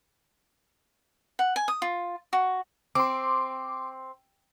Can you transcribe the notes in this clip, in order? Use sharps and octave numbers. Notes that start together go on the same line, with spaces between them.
F#5
G#5
D#6
F4
F#4
C4 C6 D6